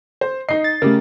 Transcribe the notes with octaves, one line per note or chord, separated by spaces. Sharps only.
C5
D#4 D#5 C7
A6
C#3 A3 G4 A#4